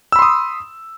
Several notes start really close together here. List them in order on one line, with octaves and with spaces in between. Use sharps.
E6 B5 C6 D#6